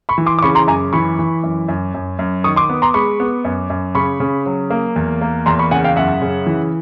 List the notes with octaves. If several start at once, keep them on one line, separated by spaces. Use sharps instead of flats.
B5 C#6
E3
C6 D6
D6
C#3 B5 C#6
A#5 C6
F#2 G#5 A#5
E3 B5 C#6
E3
F#2
F#2
F#2
F#2
D#3 C#6 D#6
C6 D6
B3
A#5 C6
G#3 B5 C#6
B3
F#2
F#2
C#3 B5 C#6
C#3
F#3
A#3
E2
A#3
E2 A#5 C6
B5 C#6
C#3 F#5 G#5
F5 G5
F#2 E5 F#5
C#3
E3